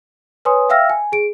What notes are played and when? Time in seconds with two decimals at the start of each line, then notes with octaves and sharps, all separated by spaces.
0.45 B4 C#5 G#5 C6 D#6
0.69 E5 F5 G5 E6 F6 A#6
0.90 G#5
1.12 G#4 D7